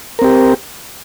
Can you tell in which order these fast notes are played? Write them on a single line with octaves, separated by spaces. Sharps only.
A#4 C4 G4